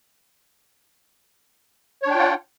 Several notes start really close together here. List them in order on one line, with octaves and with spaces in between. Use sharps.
C#5 D4 G5 F4 F#5